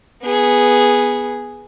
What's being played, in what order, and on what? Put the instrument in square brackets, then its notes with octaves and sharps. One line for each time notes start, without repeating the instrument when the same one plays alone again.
[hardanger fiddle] B3 G#4